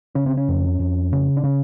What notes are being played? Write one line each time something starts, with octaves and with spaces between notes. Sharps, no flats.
C#3 C#4
C4
C#4
F2
F2
C#3
D4
C#3 C#4